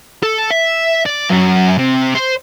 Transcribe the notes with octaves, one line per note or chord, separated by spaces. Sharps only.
A4
E5
D5
F#2
C3
C5